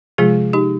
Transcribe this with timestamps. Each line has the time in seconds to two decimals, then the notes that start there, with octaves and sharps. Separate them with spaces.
0.18 C3 F3 G#3 F4 G#4
0.53 D#4 G4